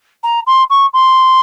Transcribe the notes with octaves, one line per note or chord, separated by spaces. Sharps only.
A#5
C6
C#6
C6